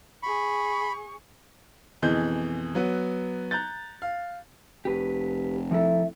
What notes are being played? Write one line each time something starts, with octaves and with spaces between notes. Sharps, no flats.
G#4 B5 C#6
F2 B2 E3 G#4 D#5 G6
F#3 B3
A#5 F#6 G6 A6
F5
F1 G4 B4
F3 E4 A4 E5